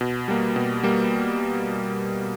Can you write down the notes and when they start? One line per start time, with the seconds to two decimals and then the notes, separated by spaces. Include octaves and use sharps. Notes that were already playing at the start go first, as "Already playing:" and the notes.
0.01 B2
0.28 G3 A#3
0.56 B2
0.83 G3 A#3